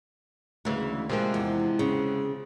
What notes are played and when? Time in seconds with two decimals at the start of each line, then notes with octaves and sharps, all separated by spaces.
0.65 D2 C#3 E3 G#3
1.09 C3 F3 G#3 A#3 C4
1.34 E2
1.79 C#3